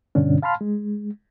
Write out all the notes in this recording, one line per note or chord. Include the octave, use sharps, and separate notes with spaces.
G2 B2 D3 C#4 D4
F5 A5 B5 C6 F6
G#3